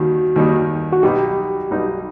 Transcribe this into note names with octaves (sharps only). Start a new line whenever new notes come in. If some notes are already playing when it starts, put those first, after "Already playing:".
Already playing: D#2 D#3 G3 F#4
D#2 D#3 G3 D#4
F#4
B1 B2 G3 D#4 G4
B1 B2 G3 D#4